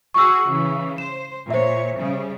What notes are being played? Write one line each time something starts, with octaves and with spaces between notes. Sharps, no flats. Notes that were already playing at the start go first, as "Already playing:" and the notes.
F#4 G#4 C#6 E6
C#3 E3
C5 E7
A#2 C5 C#5 E5
C#3 G3